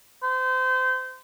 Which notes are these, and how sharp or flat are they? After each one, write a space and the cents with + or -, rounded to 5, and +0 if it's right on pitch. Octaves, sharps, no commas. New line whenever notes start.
C5 -30